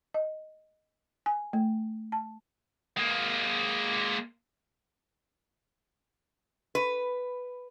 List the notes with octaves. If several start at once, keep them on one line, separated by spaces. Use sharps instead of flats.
D#5
G#5
A3
A5
G#3 A#3
B4